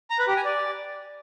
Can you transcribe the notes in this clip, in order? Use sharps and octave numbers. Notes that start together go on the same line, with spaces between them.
A#5
B4
G4
G#5
D5